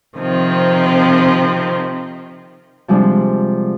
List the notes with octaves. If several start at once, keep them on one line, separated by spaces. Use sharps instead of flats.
C3 D#3 F3 C4
C3 F3 G3 G#3 D4